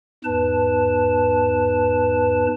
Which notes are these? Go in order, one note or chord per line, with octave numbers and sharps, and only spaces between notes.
E2 G#2 B4 A5